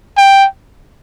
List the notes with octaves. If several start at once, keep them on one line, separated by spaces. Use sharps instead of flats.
G5